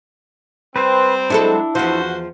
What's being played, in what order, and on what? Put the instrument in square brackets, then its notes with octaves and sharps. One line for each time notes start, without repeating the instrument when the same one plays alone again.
[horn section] G3 C4 [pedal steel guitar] B4 C5
[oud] F#3 G#3 A4 [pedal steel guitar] D4 E4
[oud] E2 F3 [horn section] F#4 C5